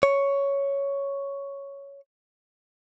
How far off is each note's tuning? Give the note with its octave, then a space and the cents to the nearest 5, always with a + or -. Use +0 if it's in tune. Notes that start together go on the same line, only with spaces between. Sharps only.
C#5 +5